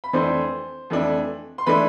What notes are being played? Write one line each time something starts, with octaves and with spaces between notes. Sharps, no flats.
B5
F2 E3 A3 D4 C5 C6
F2 E3 A3 D4
C6
E3 A3 D4 B4 B5